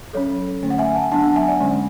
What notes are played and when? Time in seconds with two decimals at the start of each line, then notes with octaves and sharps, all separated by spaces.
0.13 F#3 C#4 A4 C#5
0.63 D3 A3 C#4
0.70 F#5
0.79 E5 G#5
0.95 F#5 A5
1.11 F#3 B3 D4 F#5 A5
1.23 F#5 A5
1.36 E5 G#5
1.48 D5 F#5
1.60 D3 G#3 C#4